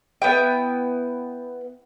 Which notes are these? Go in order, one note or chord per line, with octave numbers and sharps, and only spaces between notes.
B3 E4 G5